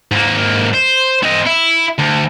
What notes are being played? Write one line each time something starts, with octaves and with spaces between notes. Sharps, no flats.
G#2 A#3
C5
C4 D#5
E4
D2